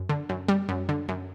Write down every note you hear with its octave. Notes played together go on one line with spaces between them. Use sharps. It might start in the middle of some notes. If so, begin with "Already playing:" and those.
Already playing: F#2
D3
F#2
G3
F#2
D3
F#2